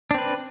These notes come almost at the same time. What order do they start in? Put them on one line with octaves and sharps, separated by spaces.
D4 C4 B4